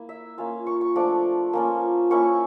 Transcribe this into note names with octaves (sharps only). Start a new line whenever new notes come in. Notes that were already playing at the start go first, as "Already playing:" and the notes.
Already playing: A#3 E4
E5
A#3 C#4 F4 F5
C#6
C#6
F3 A3 D4 F4 D6
A#3 C#4 F4
A#3 C#4 E4 C#6